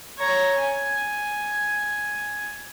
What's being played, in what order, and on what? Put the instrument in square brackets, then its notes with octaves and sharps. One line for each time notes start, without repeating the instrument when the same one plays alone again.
[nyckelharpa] C#5 A#5
G#5